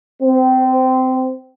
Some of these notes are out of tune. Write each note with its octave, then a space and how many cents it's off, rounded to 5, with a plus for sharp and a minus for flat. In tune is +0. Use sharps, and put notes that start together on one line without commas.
C4 -20